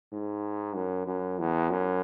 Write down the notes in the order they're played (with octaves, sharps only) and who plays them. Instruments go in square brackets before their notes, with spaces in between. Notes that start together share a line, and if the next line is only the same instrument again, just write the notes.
[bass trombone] G#2
F#2
F#2
E2
F#2